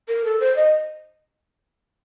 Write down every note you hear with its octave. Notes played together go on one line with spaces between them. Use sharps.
A#4
A4
C5
D#5